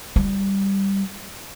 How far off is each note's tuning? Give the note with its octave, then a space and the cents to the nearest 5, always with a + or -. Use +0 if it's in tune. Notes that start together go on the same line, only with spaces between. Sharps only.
G3 +0 F4 -40